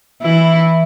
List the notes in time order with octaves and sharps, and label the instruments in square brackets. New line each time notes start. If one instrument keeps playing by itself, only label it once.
[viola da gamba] E3 E4